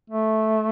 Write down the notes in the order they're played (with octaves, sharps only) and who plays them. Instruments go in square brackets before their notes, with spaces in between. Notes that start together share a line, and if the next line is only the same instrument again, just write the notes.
[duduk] A3